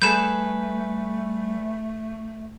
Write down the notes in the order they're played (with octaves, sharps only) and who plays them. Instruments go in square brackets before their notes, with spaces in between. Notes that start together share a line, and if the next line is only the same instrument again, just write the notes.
[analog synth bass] G3 [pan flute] A3 [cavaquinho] G#4 A4 B4 [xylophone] G6 E7